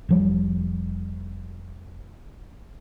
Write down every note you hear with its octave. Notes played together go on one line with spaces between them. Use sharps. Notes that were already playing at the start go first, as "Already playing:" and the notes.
F1 F3 G3